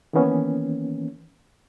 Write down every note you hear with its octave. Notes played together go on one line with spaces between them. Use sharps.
D#3 E3 A#3 B3 C#4